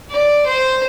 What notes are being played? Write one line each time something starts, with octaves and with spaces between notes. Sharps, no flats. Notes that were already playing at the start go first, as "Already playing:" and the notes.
D5
C5